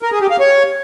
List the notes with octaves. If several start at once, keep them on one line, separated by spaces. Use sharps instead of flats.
A#4
G#4
G4
F5
C#5